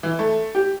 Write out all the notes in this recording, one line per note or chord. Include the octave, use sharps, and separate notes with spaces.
E3
A3
G4